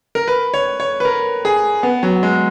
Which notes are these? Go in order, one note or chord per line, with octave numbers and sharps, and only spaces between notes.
A#4
B4
C#5
C#5
B4
A#4
G#4
B3
F#3
G#3